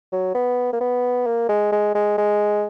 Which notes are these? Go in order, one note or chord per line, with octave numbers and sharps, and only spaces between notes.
F#3
B3
A#3
B3
A#3
G#3
G#3
G#3
G#3